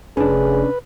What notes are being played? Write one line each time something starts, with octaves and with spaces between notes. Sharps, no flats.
F1 C#4 D4 G#4 B4